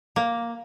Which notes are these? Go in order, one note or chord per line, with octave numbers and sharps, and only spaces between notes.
A#3